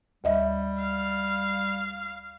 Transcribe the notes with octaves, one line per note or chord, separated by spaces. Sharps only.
D2 G3 D#5 E5
F5